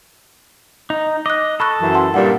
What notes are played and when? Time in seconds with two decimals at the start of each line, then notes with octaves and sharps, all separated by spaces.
0.90 D#4
1.26 D#5 D6 F#6
1.60 A4 B5 C#6 F#6
1.81 F#2 E3
1.94 F#5 A5 C6
2.14 G2 A#2 F#5